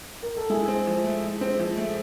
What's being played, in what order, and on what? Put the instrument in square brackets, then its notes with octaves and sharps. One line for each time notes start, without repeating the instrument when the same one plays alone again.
[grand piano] A#4
A4
[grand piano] G#3 G#4 [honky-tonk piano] E4
[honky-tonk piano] C4
F3
A3
E4
C4
F3
A3